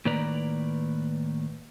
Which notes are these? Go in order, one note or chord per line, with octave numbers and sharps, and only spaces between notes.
A2 D#3 A#3 B4 D5 A#5